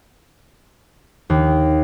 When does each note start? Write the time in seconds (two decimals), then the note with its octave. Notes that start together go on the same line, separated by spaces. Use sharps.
1.30 D#2